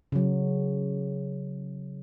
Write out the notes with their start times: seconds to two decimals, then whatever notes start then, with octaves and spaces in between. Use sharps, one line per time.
0.12 C#3 F#3